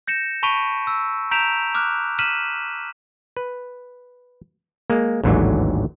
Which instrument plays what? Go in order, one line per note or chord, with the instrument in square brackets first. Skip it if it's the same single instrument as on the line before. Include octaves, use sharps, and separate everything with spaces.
[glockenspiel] G6 A#6 C#7 E7
A5 B5 C#6 B6 D7 D#7
E6
A#5 G6 B6 D7 E7 F7
D6 F6 F#6
F6 B6 D#7 E7 F#7
[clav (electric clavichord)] B4
G#3 A#3
A1 D#2 G#2 D3 E3 F#3